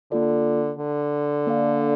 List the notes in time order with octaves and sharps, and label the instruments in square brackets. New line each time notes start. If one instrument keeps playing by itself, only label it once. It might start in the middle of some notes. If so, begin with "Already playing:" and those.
[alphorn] D3 [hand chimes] A#3 F4 A4 D5
[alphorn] D3
[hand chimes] A#3 D4 A4 D5 F5